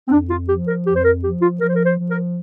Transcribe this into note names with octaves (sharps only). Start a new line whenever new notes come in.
C4
F2 D4
F4
F3 G4
A#4
F2 G4
C5
A#4
F3 G4
F4
F3 A#4
C5
A#4
C5
F3
A#4